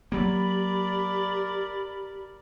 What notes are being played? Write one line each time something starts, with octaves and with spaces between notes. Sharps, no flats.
F#3 A#3 G4 A#4 D5 B5